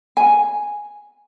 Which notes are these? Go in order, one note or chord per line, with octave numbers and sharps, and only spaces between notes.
G#5